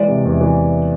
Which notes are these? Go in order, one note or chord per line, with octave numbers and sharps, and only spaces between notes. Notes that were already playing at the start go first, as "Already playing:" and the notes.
Already playing: E3 G#3 D5
C3
E2
E3